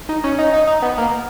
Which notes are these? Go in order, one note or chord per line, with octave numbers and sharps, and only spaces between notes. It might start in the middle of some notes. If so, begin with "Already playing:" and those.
D#4
C#4
D#4
D#4
D#4
B3
A#3